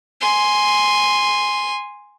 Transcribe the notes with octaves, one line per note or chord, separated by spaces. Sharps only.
G#5 C6